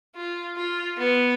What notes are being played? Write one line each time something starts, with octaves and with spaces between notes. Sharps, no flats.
F4
F4
B3